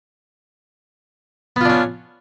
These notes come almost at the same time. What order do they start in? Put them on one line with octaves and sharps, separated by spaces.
B3 F4 D4 C#4